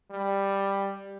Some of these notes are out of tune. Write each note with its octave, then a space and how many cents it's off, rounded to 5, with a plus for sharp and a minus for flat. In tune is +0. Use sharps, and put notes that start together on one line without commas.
G3 +10